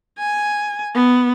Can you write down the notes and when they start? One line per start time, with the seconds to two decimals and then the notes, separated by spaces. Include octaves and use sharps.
0.19 G#5
0.95 B3